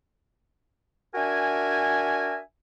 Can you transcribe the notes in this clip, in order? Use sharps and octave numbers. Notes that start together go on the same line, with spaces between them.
D4 F#4 A#4 E5 G#5